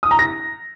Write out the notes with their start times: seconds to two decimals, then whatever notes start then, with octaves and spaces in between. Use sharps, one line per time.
0.03 D#6
0.11 A#5
0.19 A#6